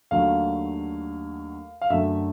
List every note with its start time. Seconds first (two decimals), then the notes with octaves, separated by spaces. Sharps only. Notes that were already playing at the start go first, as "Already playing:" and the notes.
0.11 D#2 D3 F#3 A3 F5
1.81 F5
1.90 F#2 D3 F#3 A3 E5